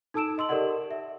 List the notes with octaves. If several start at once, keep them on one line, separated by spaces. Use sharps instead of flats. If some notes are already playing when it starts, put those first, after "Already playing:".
D#4 A4 A5 E6 D7 E7
D#5 C6 E6 F#7
G4 A4 A#4 D5 D#5 F#5
E5